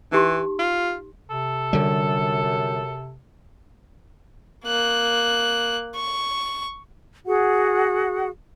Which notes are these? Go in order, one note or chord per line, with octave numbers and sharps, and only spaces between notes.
E3 D#4 G4 C6
F4
C3 A4
F#2 D3 G3
A#3 F#6
C#6
F#4 G#4 F#5